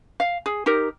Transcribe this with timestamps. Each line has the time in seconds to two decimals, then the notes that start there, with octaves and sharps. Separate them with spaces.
0.20 F5
0.46 G#4
0.66 D#4 G4 A#4